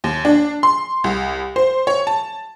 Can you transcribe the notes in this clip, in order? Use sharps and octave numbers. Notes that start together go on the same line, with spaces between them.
D#2
D4
C6
C2
C5
C#5
A5